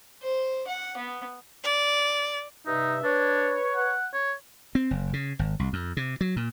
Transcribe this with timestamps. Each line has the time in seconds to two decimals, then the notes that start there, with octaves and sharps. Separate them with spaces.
0.23 C5
0.67 F#5
0.97 B3
1.64 D5
2.67 G2 C3 D#4 E5
3.04 D4 B4 C#5
3.76 F#5
4.13 C#5
4.75 C4
4.91 F#1
5.13 C#3
5.39 G#1
5.59 C2
5.73 F2
5.97 C3
6.21 F#3
6.36 A#2